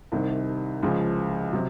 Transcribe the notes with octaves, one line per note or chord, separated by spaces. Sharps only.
C2 C3 D#3
C#2 C#3 F3
C3 F#3